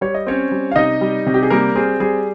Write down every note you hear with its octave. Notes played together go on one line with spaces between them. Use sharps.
G3 C#5
D#5
C4 C#4 C#5
G3
F5
C3 D#4 D#5
G3
C3
G4
G#4
G3 A#3 A#4
C4 G#4
G3 G#4